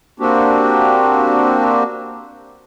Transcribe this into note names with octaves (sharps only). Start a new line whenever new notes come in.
A#3 C4 D4 F#4 G4